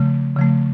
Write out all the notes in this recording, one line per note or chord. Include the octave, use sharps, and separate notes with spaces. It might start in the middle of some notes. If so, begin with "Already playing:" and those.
Already playing: C#3 F3 A3
C#3 F3 A3